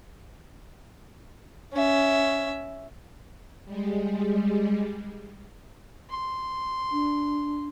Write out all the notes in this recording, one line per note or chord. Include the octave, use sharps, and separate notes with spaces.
C#4 E5
G3 G#3
C6
D4